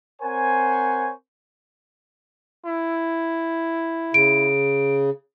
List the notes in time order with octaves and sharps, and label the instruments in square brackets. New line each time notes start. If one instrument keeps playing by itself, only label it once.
[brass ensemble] C4 A#4 C5 C#5 F#5 G#5
[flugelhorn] E4
[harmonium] C#3 [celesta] D7